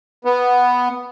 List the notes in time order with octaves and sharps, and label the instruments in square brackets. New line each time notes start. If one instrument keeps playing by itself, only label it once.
[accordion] B3